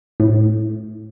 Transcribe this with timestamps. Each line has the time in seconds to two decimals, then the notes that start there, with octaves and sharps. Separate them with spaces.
0.20 A2